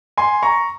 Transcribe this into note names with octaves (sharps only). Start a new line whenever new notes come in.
G#5 C6
A#5 C#6